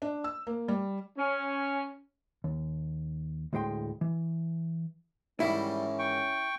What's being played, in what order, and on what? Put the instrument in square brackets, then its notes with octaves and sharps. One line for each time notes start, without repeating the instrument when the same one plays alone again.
[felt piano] D4
E6
A#3
G3
[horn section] C#4
[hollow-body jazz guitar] D#2
D2 A2 G#3 G5 C6
E3
[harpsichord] G#2 D#3 E3 [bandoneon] G3 [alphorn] C#4 [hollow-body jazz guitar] E4
[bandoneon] G5 C#6